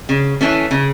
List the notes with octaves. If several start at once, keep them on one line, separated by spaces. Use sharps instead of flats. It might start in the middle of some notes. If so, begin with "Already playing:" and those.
C#3
E3 A3 C#4
C#3